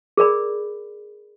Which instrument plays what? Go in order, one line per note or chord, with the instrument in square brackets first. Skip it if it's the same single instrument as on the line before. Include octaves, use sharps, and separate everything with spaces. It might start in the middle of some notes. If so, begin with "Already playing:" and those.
[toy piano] G#4 A#4 D5 B5